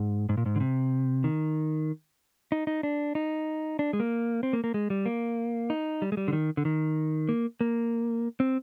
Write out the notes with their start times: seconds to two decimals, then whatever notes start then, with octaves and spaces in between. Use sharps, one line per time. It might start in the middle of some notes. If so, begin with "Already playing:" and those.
Already playing: G#2
0.29 G#2
0.37 A#2
0.46 G#2
0.56 D3
0.60 C3
1.24 D#3
2.52 D#4
2.67 D#4
2.83 D4
3.15 D#4
3.79 D4
3.93 G#3
4.00 A#3
4.43 C4
4.53 A#3
4.64 A#3
4.74 G#3
4.90 G3
5.06 A#3
5.70 D#4
6.02 G3
6.12 G#3
6.17 G3
6.28 D3
6.33 D#3
6.57 D3
6.65 D#3
7.29 A#3
7.61 A#3
8.40 C4